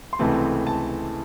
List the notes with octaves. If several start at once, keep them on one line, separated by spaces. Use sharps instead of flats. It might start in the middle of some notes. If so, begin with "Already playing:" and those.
C6
C#2 C3 E3 A3 C4 A5
A5